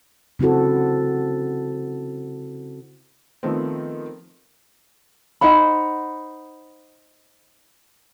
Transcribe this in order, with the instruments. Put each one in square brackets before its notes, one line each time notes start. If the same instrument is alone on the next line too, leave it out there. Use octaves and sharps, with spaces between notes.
[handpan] C#3 C4 E4 F#4 A4
[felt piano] D#3 F3 A3 B3 C4
[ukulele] D#4 C5 F#5 B5